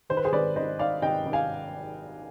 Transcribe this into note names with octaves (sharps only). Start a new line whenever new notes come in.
D#3 C5
B4
G#4 C5
G#1 B4 D5
G#1 C5 D#5
D#3 D5 F5
G#1 D#5 G5
G#1
F5 G#5